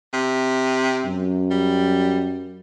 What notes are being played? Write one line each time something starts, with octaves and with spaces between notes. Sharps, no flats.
C3
F#2
G3